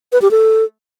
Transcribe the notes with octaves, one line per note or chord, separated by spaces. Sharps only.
B4
G4
A4